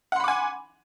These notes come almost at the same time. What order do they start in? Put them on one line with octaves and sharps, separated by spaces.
F#5 C6 B5 D6 G#5